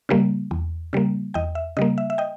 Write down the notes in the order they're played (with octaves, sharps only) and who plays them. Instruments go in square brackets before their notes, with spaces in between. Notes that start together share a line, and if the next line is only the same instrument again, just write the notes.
[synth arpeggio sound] C#3 G3 A#3
E2
C#3 G3 A#3
E2 D#5 G5
E5
C#3 G3 A#3 D#5
E5
E5
D#5 G5